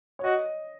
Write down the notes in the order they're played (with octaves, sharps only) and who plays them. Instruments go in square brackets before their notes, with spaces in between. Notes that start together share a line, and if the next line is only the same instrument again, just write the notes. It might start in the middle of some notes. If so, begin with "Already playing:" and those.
[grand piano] C#5
[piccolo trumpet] F#4 [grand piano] D#5